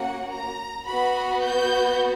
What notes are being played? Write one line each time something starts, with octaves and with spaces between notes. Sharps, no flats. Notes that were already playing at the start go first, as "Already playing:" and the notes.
Already playing: A#3 C#4 F#4 F#5
A#5
B3 F#4 B5
G6